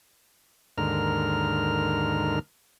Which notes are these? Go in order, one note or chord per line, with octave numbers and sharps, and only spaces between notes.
D#2 G#2 D3 A#4 F6